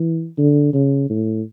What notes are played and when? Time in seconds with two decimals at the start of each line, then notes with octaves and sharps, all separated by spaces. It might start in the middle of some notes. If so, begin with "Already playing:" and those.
Already playing: E3
0.38 D3
0.73 C#3
1.10 A2